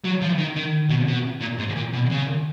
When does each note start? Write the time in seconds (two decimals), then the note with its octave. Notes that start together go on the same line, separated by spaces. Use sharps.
0.05 F#3
0.22 F3
0.38 D#3
0.56 D#3
0.89 B2
1.07 B2
1.41 A#2
1.59 G#2
1.76 A#2
1.93 B2
2.10 C#3